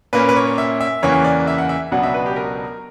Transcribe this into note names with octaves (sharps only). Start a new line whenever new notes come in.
A#2 A#3 C#4 B4
B4
C#5
E5
E5
E2 C#3 E3 A#3 C#5
D5
E5
F#5
E5
C#2 B2 F#3 B3 D4 F#5
E5
B4
G4
A#4